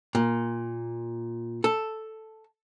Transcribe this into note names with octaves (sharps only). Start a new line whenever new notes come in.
A#2
A4